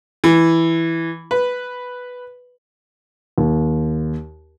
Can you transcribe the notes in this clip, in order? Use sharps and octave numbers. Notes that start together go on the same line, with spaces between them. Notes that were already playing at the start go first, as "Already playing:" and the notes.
E3
B4
D#2